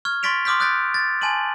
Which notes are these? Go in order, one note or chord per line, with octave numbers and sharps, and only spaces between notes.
C#6 F6 G#6
C6 C#6 A6 B6 D7 F7
C6 D6 D#6 F6 G6 B6
D#6 F#6 G6 A6 B6 D7
A6
G#5 A5 C6 D#7 F#7